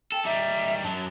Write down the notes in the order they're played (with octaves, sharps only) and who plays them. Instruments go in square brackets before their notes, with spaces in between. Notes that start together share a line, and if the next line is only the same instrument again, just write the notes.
[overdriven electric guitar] A4 [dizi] G5
[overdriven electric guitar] G3 D#4 [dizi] E5
[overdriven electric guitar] F#2 F#3 [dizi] A5